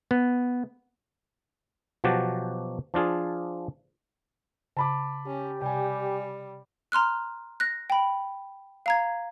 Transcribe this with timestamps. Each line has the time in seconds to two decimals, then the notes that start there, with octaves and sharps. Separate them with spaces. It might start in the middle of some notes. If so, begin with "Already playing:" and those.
0.11 B3
2.04 B2 F3 F#3 F#4 G4 A5
2.94 F3 D4 F4 G#4
4.77 C#3 A5 B5 D6
5.26 C#4 G4
5.62 C3 G3 G5 G#5
6.92 A#5 C6 F6 F#6
7.60 F#6 A#6
7.90 G5 B5
8.86 F5 A#5 G#6